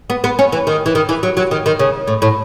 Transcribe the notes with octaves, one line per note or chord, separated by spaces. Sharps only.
B3
B3
C#4
E3
D#3
E3
D#3
E3
F#3
F#3
D#3
D#3
C#3
A2
A2